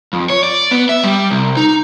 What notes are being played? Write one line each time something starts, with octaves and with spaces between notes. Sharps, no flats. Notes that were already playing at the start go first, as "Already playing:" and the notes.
F2
C#5
D5
B3
E5
G3
C2
D#4